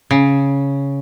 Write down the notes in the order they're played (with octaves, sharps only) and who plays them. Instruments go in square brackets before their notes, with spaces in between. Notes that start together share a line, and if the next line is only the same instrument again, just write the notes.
[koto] C#3